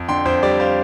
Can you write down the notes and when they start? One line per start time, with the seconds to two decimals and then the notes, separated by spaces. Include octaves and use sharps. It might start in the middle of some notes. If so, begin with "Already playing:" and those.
Already playing: F2
0.08 D3 G5 C6
0.25 F2 C5
0.43 G3 D5
0.60 C5 F5